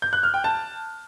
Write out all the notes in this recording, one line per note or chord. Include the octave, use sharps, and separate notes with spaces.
G6
F#6
F6
G5
A5